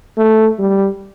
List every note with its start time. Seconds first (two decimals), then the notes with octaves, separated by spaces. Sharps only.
0.17 A3
0.59 G3